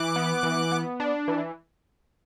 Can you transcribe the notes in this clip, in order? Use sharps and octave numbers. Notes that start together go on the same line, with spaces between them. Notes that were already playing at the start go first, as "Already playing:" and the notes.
Already playing: E3 D6 F#6
B3
E3
B3
D4
E3